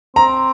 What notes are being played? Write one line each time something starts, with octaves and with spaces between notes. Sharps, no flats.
C4 A#5